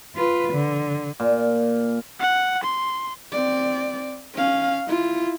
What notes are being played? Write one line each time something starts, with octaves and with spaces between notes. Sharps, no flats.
F4 B4
D3
A#2
F#5
C6
C4 D5
C#4 F5
E4 F4